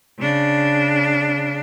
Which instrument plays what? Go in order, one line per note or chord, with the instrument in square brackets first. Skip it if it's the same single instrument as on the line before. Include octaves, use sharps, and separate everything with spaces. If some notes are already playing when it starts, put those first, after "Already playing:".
[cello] C#3 D4